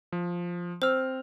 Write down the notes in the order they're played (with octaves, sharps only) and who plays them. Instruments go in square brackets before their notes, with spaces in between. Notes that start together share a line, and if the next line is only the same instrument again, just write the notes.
[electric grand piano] F3
[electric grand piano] C4 F6 [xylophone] C5 E6